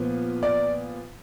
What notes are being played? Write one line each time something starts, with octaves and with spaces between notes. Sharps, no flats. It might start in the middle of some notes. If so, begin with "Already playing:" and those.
Already playing: A#2 F3 B3
D5